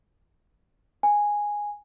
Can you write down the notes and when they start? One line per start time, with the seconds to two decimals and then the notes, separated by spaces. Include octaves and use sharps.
1.03 G#5